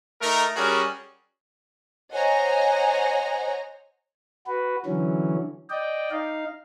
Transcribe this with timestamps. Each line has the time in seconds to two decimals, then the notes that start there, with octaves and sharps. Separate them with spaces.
0.21 A3 D#4 A#4
0.56 G3 C#4 F#4 G#4 A#4
2.14 C5 C#5 D#5 F#5 G#5 A#5
4.47 F#4 B4
4.86 D3 E3 F#3 C#4
5.70 D5 D#5 G5
6.11 D#4 F5